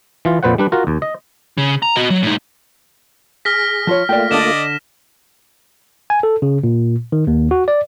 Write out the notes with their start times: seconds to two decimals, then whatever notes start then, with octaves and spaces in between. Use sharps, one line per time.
0.25 E3 F4
0.43 F2 A#2 B4 C5 F#5
0.58 G3 D4 B4
0.72 F4 F#4 A#4
0.87 D#2
1.02 D#5
1.58 C#3
1.82 A#5
1.96 F#4 D#5
2.10 F#3
2.23 A2 D#4
3.45 G#4 F6 A#6 B6
3.87 F3 F4 C#5
4.09 A3 A#3 F4 D5 G5
4.31 D3 D4 D5 D#5 E7
6.10 G#5
6.23 A4
6.42 C#3
6.64 A#2
7.12 D#3
7.27 D#2
7.51 F#4
7.68 D5